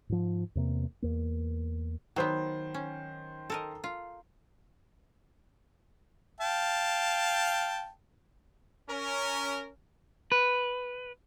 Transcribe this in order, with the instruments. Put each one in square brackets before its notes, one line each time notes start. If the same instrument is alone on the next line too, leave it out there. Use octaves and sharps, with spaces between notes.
[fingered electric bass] G#2 F3
E2 C3 A#3
E2 A#3
[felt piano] D#3 C5 [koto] F#3 B3
[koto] C#4
A4 A#4 D#5
F4
[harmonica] F5 G5 A5
[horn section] C#4 A#4
[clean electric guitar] B4